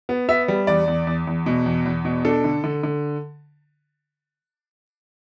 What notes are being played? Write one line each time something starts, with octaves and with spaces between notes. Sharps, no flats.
B3
B3 E5
G3
E2 D5
E2
E2
E2
B2
E2
E2
B2
D4 A4
D3
D3
D3